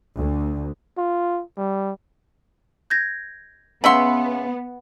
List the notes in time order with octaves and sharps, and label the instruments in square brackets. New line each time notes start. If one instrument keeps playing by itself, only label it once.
[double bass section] D2
[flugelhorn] F4
G3
[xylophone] G6 G#6 A#6
[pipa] C#3 E5 C6 [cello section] B3 [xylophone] F#5 F#7